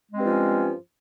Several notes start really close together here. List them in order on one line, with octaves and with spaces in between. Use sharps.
G#3 C4 G2 F3 C#4